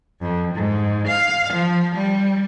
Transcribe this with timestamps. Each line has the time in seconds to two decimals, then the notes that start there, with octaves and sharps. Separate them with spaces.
0.21 F2
0.55 G#2
1.07 F5
1.53 F3
1.95 G3